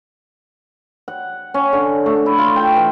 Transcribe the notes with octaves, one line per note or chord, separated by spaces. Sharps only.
F#5
C#4
D3
A3
E4
F4
G5
E3